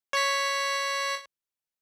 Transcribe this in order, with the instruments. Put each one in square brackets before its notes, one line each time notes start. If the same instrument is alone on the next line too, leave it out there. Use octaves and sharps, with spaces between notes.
[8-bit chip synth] C#5 C#6 B6